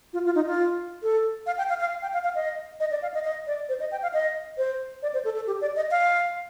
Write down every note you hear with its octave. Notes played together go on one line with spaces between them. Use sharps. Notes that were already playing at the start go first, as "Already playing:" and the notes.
F4
F4
D#4
F4
A4
F5
G5
F5
F5
G5
F5
F5
D#5
D#5
D5
F5
D#5
D#5
D5
C5
D#5
G5
F5
D#5
C5
D5
C5
A4
A4
G4
D5
D#5
F5